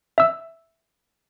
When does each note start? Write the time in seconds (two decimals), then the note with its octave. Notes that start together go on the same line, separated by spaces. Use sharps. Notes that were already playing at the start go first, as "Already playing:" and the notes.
0.18 E5 E6